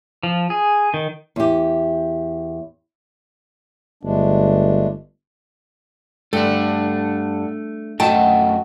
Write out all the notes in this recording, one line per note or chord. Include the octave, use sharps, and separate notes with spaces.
F3
G#4
D#3
E2 G4
G1 G#3 A3 D4
G2 A3 A4 F#5
F#2 A3 F#4 D#5 E5 G5 A5